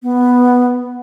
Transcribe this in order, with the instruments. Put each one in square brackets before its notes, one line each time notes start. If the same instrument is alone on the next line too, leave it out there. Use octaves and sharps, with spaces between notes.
[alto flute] B3